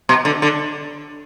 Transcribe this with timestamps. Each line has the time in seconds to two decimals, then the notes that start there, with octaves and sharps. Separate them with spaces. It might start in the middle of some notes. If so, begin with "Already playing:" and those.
0.09 B2
0.25 D3
0.42 D3